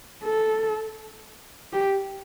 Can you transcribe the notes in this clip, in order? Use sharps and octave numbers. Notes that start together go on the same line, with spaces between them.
A4
G4